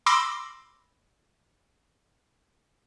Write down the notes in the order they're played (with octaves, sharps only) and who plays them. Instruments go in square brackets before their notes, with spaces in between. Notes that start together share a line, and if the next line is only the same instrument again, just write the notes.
[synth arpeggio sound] B5 C6 D6 E6 A#6